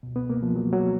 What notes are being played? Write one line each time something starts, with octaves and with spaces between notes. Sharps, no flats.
C#2 B2
B3
A#3
F3
F#3
F#3